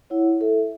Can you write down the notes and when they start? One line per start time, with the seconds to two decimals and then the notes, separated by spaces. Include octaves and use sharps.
0.10 E4 C#5 F#5
0.39 E4 A4 E5